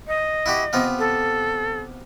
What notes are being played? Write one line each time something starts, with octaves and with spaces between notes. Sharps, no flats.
D#5
E4 F#4 G4
C3 B3 F4
A4